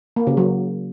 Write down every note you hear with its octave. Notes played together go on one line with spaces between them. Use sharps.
A#3
C#3
F#3